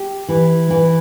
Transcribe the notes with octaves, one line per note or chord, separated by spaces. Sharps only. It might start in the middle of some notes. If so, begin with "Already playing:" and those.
Already playing: G4
E3
E3